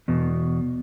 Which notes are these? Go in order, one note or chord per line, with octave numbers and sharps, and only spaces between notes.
E2 B2